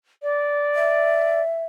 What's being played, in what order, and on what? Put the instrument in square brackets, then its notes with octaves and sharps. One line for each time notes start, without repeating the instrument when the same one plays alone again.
[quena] D5
[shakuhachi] E5